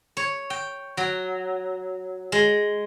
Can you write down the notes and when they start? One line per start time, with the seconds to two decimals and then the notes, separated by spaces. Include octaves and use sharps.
0.17 C#5
0.50 G5
0.97 F#3
2.32 G#3